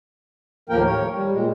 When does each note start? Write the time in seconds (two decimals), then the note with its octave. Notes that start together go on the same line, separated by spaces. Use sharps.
0.69 D#2 A2 F3 A#3 A#4 G5
0.85 C#5
1.13 G3
1.32 A#2 G#3